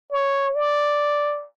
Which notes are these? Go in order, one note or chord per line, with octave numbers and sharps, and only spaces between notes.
C#5
D5